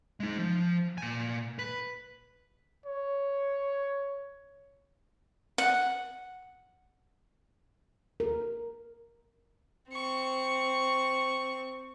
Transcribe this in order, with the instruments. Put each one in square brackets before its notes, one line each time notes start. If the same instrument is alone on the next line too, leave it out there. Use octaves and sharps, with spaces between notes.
[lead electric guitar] G#3 D#4
F3
A#2 G#5
B4
[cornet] C#5
[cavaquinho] F#5
[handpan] A#4
[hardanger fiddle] C4 C#6